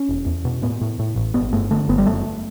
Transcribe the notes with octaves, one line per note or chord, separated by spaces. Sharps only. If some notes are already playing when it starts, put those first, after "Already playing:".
Already playing: C#4
E1
E2
B2
A2 B3
A2
A2
A1
G1 B3
G2 A3
D3 A3
G1 B3
G3
F#1 A3